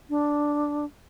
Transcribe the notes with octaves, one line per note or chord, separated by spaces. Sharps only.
D4